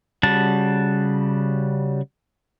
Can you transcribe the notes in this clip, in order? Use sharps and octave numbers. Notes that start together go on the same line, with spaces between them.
C#3 G3 F#4 A5